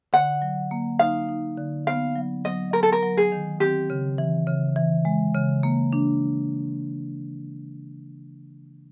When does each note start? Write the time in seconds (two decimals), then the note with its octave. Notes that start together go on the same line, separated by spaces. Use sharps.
0.13 D3 F#5
0.42 F#3
0.71 A#3
0.99 D#4 F5
1.29 D#4
1.58 D3
1.87 B3 F5
2.16 F#3
2.45 F#3 D#5
2.73 F#3 A#4
2.83 A4
2.92 A#4
3.02 F#3
3.17 G#4
3.32 D#3
3.60 C4 G4
3.90 C#3
4.18 E3
4.47 C#3
4.76 E3
5.05 G#3
5.35 C#3
5.63 A#3
5.93 D4